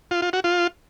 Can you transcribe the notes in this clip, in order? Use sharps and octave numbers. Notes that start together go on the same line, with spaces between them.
F4
F4
F#4
F4